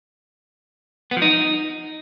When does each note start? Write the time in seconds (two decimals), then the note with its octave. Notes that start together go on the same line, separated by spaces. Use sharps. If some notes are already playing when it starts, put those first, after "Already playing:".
1.11 B3
1.17 F3
1.22 D#4